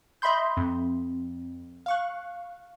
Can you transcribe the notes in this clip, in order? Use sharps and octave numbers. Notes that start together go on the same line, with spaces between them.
D#5 E5 B5 C6 G6
F2
F5 C#6 F#6